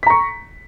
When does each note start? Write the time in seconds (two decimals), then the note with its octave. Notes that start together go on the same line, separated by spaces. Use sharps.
0.03 B6
0.06 A#5
0.10 C#6